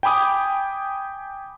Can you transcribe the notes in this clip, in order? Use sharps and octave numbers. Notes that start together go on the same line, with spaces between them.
G5 G#5 B5 D6 D#6